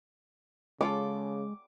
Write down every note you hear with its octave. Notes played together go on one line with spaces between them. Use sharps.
C#3 G#3 C#4 F4 A4 D6